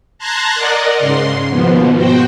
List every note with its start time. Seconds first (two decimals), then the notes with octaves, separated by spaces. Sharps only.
0.18 A5 A#5 C6 F#6 G#6 A#6
0.55 A#4 D5 D#5 F#5
0.98 G#2 C#3 C6
1.50 D#2 G#2 B2 F3 B3
1.95 F#4 C5 G5